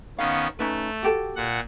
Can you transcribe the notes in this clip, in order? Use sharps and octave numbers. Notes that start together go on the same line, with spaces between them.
D#3 B3 C#4 F5
A3 C#4 D#4 B4
F#4 G4 A4
A#2 F#5